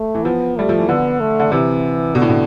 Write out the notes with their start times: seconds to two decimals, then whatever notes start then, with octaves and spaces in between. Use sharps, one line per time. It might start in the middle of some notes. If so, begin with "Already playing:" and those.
Already playing: A3
0.15 E3
0.25 F3 B3
0.57 G3 A3
0.69 F3
0.79 E3
0.89 D3 B3
1.20 A3
1.40 D3
1.52 C3 E3
2.15 B2 D3
2.22 A2
2.29 B2